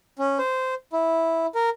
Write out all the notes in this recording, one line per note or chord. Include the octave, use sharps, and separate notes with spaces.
C#4
C5
E4
A#4